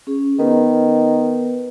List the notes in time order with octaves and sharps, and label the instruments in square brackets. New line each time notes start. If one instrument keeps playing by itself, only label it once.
[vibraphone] C#4 G#4
[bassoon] D#3 [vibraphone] B3 B4